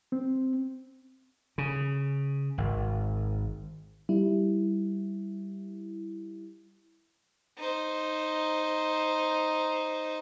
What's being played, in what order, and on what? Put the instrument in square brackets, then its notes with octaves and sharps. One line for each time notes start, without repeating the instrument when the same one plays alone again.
[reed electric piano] C4
[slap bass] C#3
G#1
[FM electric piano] G3 E4
[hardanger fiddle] D#4 C5